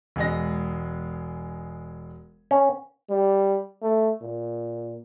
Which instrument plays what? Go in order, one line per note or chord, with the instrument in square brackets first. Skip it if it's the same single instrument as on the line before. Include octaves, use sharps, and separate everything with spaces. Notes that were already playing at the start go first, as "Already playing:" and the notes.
[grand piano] E1 G#3 A#6
[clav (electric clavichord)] C#4
[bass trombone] G3
A3
A#2